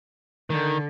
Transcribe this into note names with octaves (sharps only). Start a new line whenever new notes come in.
D3 D#3